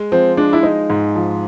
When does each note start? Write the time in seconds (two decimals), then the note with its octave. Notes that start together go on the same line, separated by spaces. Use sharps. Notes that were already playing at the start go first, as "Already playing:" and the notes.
Already playing: G#3
0.12 F3 C4
0.37 G#3 D4
0.53 E4
0.63 G#3 D#4
0.90 G#2
1.16 F3